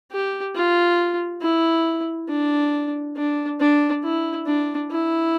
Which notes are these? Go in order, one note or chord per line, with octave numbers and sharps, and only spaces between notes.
G4
F4
E4
D4
D4
D4
E4
D4
E4